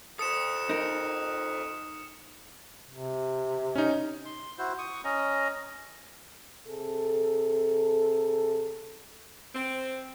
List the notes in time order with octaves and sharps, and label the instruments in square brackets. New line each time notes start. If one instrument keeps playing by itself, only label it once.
[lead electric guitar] A4 C5 [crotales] D#6 C#7 E7
[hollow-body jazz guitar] D#4 A#4
[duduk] C3
[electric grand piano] C#4 D#4
[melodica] C6
E4 F#4 C5
C#6 D#6
C#4 D#5 A#5
[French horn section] C3 G#4 A4
[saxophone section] C4